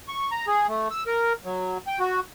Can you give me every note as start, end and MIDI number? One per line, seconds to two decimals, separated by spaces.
0.08 0.30 85
0.31 0.46 82
0.47 0.67 68
0.69 0.88 57
0.91 1.04 88
1.06 1.33 70
1.45 1.78 54
1.87 1.99 79
2.00 2.20 66